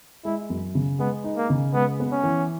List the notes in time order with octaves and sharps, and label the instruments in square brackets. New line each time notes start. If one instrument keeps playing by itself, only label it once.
[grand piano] G#3 [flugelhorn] E4
[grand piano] F#2
C#3
[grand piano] G#3 [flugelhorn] B3
[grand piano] D#4
[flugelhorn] A#3
[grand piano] C#3
[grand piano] G#3 [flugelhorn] B3
[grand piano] B3
[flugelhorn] C#4
[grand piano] E3